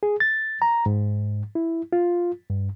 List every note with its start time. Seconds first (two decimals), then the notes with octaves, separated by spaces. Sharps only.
0.03 G#4
0.20 A6
0.62 A#5
0.86 G#2
1.55 E4
1.93 F4
2.50 G2